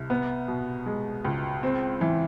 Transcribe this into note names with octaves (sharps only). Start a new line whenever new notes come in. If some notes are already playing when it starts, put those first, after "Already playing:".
Already playing: C2
B3
B2
G#3
C#2
C4
E3